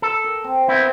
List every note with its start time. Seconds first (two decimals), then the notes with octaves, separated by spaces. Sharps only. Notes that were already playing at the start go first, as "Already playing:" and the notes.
0.02 A4
0.24 A#4
0.44 C4
0.68 B3 C4 E4 C5 D#5